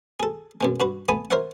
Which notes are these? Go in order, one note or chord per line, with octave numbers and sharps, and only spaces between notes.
G#4 A4
F#2 B2 G#3
G2 F#4 B4
A3 B3 G#5 B5 D#6
A#4 C5 C#5 E5 F#5